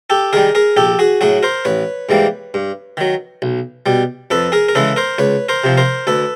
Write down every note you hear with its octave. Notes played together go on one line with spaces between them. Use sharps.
G4 A4
D#3 G3 G#4 A#4
G#4 A#4
A#1 G4 A4
F#4 G#4
A2 F#3 F#4 G#4
A#4 C5
A1 B4 C#5
G#2 E3 G3 A#3
G2
D#3 F#3
B1
B2 G3
F2 A4 B4
G#4 A#4
A#4
C#3 E3 G#3 A4 B4
A#4 C5
C#2 B4 C#5
A#4 C5
C3 F3
A#4 C5
D2 A4 B4